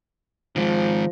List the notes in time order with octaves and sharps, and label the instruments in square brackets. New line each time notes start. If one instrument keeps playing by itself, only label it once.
[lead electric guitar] D#3 G#3 [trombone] F3